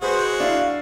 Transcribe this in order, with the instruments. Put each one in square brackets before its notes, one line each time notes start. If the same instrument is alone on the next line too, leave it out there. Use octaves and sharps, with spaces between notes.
[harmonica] G#3 F#4 [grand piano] G#4 B4 B5 [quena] C5
[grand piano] D4 E4 [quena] F5